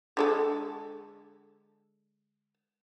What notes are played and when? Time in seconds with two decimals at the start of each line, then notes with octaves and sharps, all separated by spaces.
0.17 D3 G#3 A4